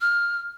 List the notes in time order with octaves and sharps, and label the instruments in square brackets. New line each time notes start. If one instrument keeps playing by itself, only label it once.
[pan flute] F6